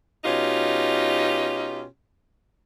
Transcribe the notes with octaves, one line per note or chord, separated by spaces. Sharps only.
B2 C#4 D#4 F4 G4